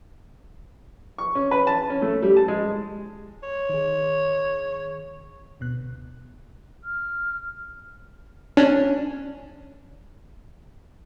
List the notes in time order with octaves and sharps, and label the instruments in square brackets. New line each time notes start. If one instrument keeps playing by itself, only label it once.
[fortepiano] C#6
C#4
B4
A5
C#4
A3
G3
A5
G#3
[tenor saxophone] C#5
[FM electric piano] D#3 G#4
D2 B2 F#6
[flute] F6
[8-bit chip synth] C#4 D4